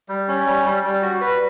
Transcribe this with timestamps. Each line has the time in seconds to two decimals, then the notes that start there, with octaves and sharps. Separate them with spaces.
0.09 G3
0.28 C#4
0.46 G3
0.65 G3
0.84 G3
1.02 F#4
1.21 B4